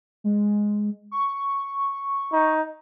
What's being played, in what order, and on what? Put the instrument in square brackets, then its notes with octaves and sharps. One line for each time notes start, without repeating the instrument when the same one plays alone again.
[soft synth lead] G#3
C#6
[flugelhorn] D#4